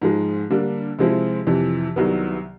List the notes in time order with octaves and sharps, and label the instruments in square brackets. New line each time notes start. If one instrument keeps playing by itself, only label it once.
[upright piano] G#2 F3 G#3
D3 G3 A#3 D4
C3 F3 G#3 C4 E4
F2 C3 E3
C2 C3 D#3 F#3 B3